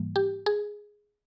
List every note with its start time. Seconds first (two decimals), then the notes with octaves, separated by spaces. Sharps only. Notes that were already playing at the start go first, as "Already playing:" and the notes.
Already playing: G#2 E3 G3 A#3
0.16 G4
0.46 G#4